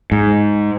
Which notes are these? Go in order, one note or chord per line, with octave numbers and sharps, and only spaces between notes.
G#2